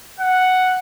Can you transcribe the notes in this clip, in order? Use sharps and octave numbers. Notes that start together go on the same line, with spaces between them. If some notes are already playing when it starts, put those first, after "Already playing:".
F#5